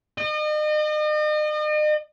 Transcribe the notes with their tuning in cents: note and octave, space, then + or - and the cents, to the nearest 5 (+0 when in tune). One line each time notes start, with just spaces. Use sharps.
D#5 -40